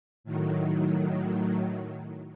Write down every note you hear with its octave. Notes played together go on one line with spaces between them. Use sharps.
A2 D#3 F#3